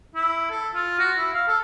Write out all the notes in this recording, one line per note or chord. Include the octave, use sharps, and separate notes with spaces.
E4
A4
F4
F#4
E4
F5
A4